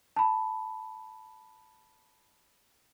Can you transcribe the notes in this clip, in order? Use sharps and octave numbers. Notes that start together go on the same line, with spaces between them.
A5 B5